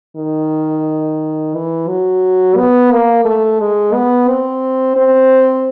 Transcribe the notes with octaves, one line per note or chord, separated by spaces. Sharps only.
D#3
E3
F#3
B3
A#3
A3
G#3
B3
C4
C4